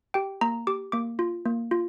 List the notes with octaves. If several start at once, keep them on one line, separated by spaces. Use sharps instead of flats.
G4 G5
A#3 A#5
G4 D6
A#3 D6
F4
A#3
F4